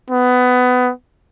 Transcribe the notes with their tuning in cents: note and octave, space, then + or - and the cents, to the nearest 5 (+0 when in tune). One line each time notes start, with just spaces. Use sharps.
B3 +20